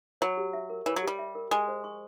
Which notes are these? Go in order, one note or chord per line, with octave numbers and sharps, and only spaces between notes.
F#3 C#5
G4
E5
A#4
E3 C#5
F#3
G4
G3
E5
A#4
G#3 G#5
C5
C#6